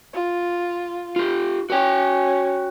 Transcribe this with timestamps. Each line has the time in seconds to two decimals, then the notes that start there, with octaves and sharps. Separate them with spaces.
0.14 F4
1.16 F4 G4
1.70 C#4 F#4 G5